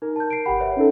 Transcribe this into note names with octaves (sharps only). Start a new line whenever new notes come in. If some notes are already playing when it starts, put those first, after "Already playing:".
D#4 A#4
A5 G6
C7 D7
G1 G4 F#5 G5 B5
B4 C#5 E5
C#4 D#4 A4